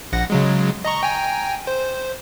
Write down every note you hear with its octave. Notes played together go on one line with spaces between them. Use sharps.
A#1 F#5 A#6
C#3 F#3 G#3
D#5 A#5 C#6
G5 G#5 A#5
C5